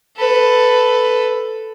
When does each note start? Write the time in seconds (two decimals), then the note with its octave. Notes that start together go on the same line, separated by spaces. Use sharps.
0.17 A4 B4